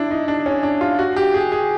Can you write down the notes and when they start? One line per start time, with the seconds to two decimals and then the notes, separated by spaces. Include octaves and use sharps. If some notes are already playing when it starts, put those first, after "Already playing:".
Already playing: D4 E4
0.11 D#4
0.28 D4
0.46 C#4
0.63 D4
0.81 F4
0.99 F#4
1.16 G4
1.34 G#4
1.52 G#4